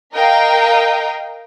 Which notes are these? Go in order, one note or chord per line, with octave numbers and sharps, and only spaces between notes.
A#4 D#5 F5 G5 A#5